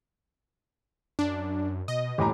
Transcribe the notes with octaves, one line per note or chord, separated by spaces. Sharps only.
F#2 D4
B2 D#5
D#1 A2 E3 G4 G#5 A#5 D6